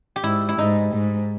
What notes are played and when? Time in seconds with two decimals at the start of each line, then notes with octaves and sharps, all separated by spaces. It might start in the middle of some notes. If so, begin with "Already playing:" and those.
0.16 G4
0.24 G#2 E4
0.49 E4
0.58 G#2 D#4
0.94 G#2